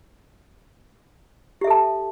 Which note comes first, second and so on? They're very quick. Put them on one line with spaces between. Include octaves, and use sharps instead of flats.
G4 E5 A4 A5